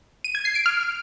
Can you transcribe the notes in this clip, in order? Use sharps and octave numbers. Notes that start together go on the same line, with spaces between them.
D#7
G#6
C7
D7
F6